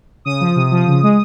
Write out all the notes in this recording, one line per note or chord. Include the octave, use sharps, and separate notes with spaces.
C#3 D#6
F3
C3
F3
C#3
G#3